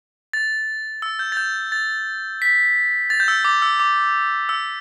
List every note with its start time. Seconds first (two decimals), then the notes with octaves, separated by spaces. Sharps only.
0.33 A6
1.02 E6
1.19 G6
1.32 A6
1.37 G6
1.72 A6
2.42 B6
3.10 A6
3.20 G6
3.28 E6
3.45 D6
3.62 E6
3.80 D6
4.49 E6